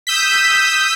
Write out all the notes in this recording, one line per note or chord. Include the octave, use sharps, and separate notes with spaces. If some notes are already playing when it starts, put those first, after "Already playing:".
D#6 E6 G6 B6